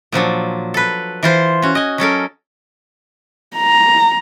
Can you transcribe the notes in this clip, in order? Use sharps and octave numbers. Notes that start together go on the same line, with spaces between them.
A#2 F3 F#3 D4
A4 B4
E3 F4 C5
C#4 F#4
D#5 G#5
F#3 C#4 A4 A#4
A#5